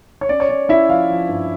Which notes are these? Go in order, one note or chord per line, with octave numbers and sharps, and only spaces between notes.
C#5
C#4 D5
C#5
C#4 D5
C#4 E4 E5
F3 F4 F5
F3
G2